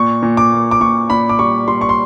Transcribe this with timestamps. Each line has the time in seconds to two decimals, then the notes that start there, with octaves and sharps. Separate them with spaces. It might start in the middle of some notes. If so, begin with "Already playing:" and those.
Already playing: A#2 C#6
0.23 A#2
0.37 D6
0.52 A#3
0.71 D6
0.81 A#2 C#6
1.10 A#2 B5
1.29 D6
1.39 G3 C#6
1.68 G3 C6
1.81 C#6
1.89 C6